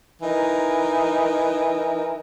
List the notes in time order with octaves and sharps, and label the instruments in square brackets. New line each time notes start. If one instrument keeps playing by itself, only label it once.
[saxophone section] E3 D#4 A#4